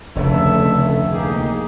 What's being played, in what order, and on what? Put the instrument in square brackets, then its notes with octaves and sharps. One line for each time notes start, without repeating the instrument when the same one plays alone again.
[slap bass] F1 D2 [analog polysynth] C#3 A3 [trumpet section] A4 E5
[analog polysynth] A#3 G#4 [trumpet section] D#4 G4